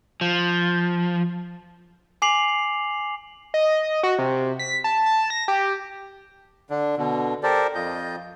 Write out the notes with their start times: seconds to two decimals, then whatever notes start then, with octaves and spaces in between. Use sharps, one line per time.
0.21 F3
2.22 G#5 D6 C7 F7 F#7
3.54 D#5
4.03 F#4
4.19 C3
4.59 B6
4.84 A5
5.06 A5
5.30 A#6
5.48 G4
6.70 D3 D4
6.97 B2 D3
7.43 G4 A4 A#4 C5 D5
7.75 F2 F4 D#5 G6